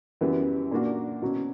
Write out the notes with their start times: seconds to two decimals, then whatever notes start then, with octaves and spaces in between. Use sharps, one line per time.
0.21 F#2 E3 G3 B3
0.71 A#2 A#3 D4 F#4
1.22 B2 F#3 C#4